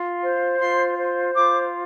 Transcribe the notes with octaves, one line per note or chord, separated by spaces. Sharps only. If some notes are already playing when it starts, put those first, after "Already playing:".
Already playing: F4
C5
F4 C6
C5
F4 D6